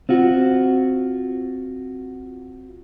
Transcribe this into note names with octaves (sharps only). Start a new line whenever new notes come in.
C4 F4 F#4